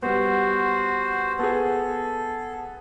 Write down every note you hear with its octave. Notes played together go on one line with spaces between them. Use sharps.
G3 B3 F#4 C5
B3 G#4 A4